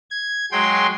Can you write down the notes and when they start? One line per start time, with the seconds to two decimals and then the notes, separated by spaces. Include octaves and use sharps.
0.11 G#6
0.52 F#3 G#3 G5 C6